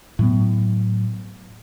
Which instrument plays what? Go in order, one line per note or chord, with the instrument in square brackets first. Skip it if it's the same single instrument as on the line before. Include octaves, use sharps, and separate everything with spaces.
[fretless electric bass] A2 F#3 B3